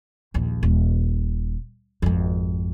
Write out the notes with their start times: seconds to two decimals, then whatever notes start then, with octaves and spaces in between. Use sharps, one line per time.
0.34 A#1 D#2
0.63 D#1
2.02 G#1 F2